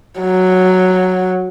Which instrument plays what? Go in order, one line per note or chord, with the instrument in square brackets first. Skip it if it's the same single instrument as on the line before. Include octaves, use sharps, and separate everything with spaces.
[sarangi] F#3